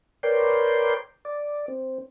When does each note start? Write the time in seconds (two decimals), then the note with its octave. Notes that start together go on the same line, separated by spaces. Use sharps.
0.23 A#4 B4 C#5 D5 G5 C6
1.25 D5
1.68 C4